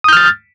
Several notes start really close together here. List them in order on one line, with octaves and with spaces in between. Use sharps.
D#6 G6 F6 A6